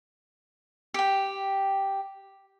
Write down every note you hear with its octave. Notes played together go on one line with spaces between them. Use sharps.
G4 G5